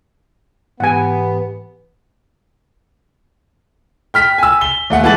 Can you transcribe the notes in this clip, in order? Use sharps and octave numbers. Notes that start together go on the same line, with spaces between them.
G#2 E3 B3 G4 F#5 G#5
G5 F6 B6
G#5 E6
G7
D#2 A3 F#5
E3 G#3 A5 A6 F#7